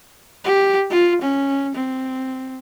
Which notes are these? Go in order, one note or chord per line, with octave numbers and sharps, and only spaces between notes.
G4
F4
C#4
C4